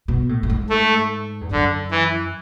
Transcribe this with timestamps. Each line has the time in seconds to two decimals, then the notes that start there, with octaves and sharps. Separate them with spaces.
0.08 B2
0.29 A2
0.43 A2
0.50 G#2
0.70 A3
1.41 E2
1.51 F#2 D3
1.91 E3